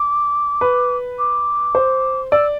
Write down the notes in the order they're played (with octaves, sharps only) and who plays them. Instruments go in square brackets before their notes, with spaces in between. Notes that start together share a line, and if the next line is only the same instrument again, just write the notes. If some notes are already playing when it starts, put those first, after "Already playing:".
Already playing: [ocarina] D6
[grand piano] B4
[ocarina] D6
[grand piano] C5
[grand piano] D5 [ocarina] E6